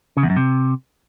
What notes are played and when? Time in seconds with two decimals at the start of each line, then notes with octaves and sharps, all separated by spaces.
0.17 C#3
0.23 E2
0.30 F#2
0.36 C3